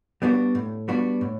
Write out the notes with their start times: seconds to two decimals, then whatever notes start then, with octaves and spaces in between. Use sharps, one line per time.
0.22 G3 B3 D4 F#4
0.55 A2
0.88 G3 B3 D4 F#4
1.21 A2